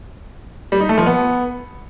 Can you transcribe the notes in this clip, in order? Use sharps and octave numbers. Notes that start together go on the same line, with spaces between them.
G3
D#4
A3
F3
B3